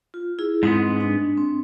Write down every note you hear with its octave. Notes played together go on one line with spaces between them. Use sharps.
F4
E4 G#4
G#2 G#3 B3 C4
D4
C4